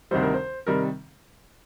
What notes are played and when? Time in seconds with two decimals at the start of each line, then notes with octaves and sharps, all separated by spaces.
0.11 D2 C3 D#3 G3 C5
0.22 A#4
0.34 C5
0.67 C3 D#3 G3 A#4